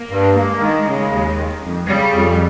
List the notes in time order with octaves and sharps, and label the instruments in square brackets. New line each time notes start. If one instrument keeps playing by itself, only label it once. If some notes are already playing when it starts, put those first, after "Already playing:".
Already playing: [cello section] A#3
[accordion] G2
[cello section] G#3 [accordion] A#3
[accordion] D#3
C#3
D#2
D#3
F2
[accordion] C#3 [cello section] G3
[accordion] F2